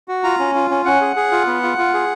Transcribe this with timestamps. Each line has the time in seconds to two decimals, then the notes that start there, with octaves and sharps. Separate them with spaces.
0.08 F#4
0.24 F4 A#5
0.39 C#4
0.55 F4
0.70 C#4
0.85 C#4 F#5
1.01 G#4
1.16 G#4
1.32 F4
1.47 B3
1.63 F4
1.78 F4
1.94 G#4